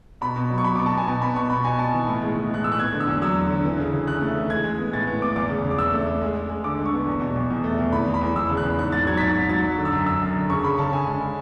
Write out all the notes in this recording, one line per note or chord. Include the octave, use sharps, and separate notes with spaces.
B2 B5
B2
F#3
C#6
F#3 B5
D6
B2
A5
B2 G#5
B2 A5
B3 B5
B2 C#6
B2 B5
B2 G#5
B2 A5
E3
A2
G#3
E3
G#3 F#6
A2 E6
F#6
B3 G#6
D3
E6
E2
F#3 E6
D3
D3
E3
C#3
C#3
C#3 F#6
A3
E3
G#3 G#6
G#3
B3
A2 A6
B3
B3 D6
E2 D6
C#3
C#3
D6
E2 E6
A3
A3
G#3
G#3
G#3
D3 D6
D3
C#6
B3
E2
B2
E2
E2
A3
E2
E3 B5
E3
B5
E2
E2 E6
C#3
F#6
E2
G#2 F#6
G#2 A6
F#3 G#6
B6
G#2 A6
G#2 A6
F#3 A6
F#3
D3
E6
F#2
F#2 E6
F#2
D3
C#3 C#6
C#3 B5
C#3 A5
C#3 G#5
G#3
G#3